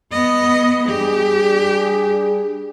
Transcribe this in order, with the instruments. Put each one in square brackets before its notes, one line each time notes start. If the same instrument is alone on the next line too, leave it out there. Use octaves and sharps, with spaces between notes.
[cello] B3 D#5
[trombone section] G3 D4 G#4 [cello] G4